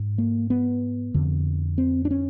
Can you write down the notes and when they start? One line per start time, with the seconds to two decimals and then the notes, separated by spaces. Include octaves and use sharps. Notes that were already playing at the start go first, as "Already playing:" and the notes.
Already playing: G#2
0.18 A#3
0.50 B3
1.14 F2 D3
1.78 C4
2.05 D4
2.11 C#4